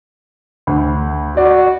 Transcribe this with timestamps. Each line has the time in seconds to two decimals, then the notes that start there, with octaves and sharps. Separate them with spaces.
0.67 D2
1.37 F#4 D5